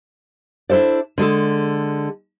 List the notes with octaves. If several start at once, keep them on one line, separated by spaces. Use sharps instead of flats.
D4 E4 A4 C5 D5
D3 G#3 G#4 A4